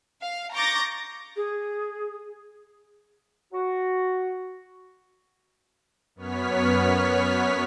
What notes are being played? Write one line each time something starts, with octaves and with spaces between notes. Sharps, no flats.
F5
A#5 C#6 D6 G6 A6 A#6
G#4
F#4
F#2 B3 C#5 F6 B6